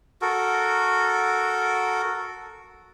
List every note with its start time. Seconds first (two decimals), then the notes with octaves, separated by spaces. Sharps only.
0.22 F#4 A4 A#4